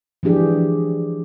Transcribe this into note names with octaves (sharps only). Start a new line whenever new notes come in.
E3 F3 D4 G4 G#4